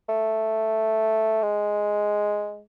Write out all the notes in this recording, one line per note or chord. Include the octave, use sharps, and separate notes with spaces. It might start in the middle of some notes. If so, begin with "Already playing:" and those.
A3
G#3